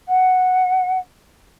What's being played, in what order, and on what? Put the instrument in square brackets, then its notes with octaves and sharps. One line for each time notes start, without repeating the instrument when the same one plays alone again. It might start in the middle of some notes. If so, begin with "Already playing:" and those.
[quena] F#5